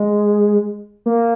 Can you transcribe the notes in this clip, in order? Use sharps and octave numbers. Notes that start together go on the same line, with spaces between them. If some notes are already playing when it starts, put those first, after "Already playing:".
Already playing: G#3
A#3